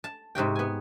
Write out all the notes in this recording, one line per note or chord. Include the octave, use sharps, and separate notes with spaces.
A5
G#2 C3 F#4 G5
B3 G#5